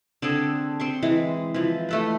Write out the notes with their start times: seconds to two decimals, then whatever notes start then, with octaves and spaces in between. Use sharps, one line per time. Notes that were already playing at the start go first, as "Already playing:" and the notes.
0.22 D3 C4 G#4 A4
0.80 C4 C6 C#6
1.03 E3 G#3
1.54 E3 F3
1.89 A3 A4 B4